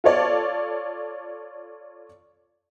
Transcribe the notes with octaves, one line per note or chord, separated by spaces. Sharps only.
F4 A4 C#5 D5